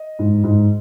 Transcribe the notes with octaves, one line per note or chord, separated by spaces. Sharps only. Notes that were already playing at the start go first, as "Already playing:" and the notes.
Already playing: D#5
G#2
G#2